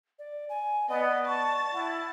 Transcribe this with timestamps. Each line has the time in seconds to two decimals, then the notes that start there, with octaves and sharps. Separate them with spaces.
0.19 D5
0.49 G#5
0.90 B3 D5 D#5
1.25 A5 C#6
1.74 E4 F#5